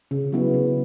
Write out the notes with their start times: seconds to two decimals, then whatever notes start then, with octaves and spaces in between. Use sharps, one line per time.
0.11 C#3
0.32 F#3 B3 E4
0.54 C#3